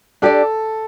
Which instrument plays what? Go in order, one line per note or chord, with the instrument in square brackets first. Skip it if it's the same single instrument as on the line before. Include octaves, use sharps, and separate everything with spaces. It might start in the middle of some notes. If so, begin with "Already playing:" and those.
[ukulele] D4 G4 D5 [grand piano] A4